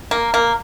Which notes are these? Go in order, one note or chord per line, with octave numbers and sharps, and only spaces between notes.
A#3
A#3